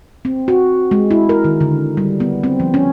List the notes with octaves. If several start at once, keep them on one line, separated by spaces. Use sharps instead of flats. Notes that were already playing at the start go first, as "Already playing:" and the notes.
C4
F#4
G#3
E4
A#4
D#3
D3
G3
B3
C4
F3
C#4